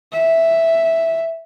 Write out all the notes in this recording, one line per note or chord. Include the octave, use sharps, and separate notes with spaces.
E5